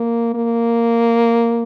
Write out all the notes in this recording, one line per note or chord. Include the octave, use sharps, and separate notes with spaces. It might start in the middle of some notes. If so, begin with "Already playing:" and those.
Already playing: A#3
A#3